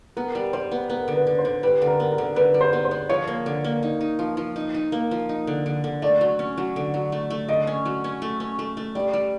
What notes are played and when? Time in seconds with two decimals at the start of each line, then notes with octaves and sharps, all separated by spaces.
0.17 B3 A#4
0.35 G3
0.53 G3 C5
0.71 B3
0.90 B3 A#4
1.08 D3
1.14 B4
1.27 D3
1.39 C5
1.45 D3
1.63 G3 B4
1.82 D3
1.87 A#4
2.00 B3
2.12 A#4
2.18 D3
2.36 D3 B4
2.54 G3
2.61 C5
2.73 B3
2.85 C5
2.91 B3
3.09 F3 C#5
3.28 A#3
3.46 D3
3.64 A#3
3.83 D#4
4.01 D#4
4.19 F3
4.37 F3
4.56 D#4
4.74 D#4
4.92 A#3
5.11 F3
5.29 D#4
5.47 D3
5.66 D3
5.84 D3
6.02 A3 D5
6.21 F#3
6.39 C#4
6.58 F#3
6.76 D3
6.94 F#3
7.12 A3
7.30 A3
7.48 D3 D#5
7.67 C#4
7.85 F#3
8.04 C#4
8.22 A3
8.40 C#4
8.59 A3
8.77 A3
8.95 G3 D5
9.13 G3